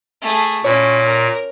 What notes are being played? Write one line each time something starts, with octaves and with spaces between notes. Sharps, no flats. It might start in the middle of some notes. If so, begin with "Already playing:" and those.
A3 G#4
A#2 C#4 E4 C#5
A#4